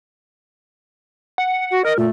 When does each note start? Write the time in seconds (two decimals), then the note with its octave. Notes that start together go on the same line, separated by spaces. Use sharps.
1.38 F#5
1.71 F#4
1.85 A#4 D#5
1.98 A#2 A3